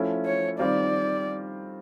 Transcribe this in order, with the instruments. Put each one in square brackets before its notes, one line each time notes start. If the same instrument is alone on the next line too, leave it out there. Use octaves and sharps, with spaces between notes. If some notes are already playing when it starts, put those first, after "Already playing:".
Already playing: [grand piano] F3 A3 C#4 E4
[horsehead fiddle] C#5
[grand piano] D#3 G3 C4 F4 [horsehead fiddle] D5